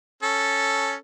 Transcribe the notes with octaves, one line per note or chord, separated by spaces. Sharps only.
C#4 A4